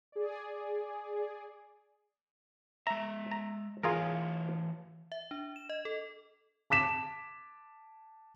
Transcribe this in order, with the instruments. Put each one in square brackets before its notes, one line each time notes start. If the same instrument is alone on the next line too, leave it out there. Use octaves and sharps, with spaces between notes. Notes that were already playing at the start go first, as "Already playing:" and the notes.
[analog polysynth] G#4 D5
[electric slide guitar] G#3 E5 [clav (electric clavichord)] A#5
[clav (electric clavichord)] A#5
[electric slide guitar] E3 C#5 F5 [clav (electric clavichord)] F4 G#4 A#4
[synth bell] E5
D4
E7
D#5
A4
[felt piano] A5 D6 B6 E7